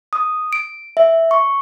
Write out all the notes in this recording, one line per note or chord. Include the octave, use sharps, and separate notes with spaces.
D#6
D7
E5
C#6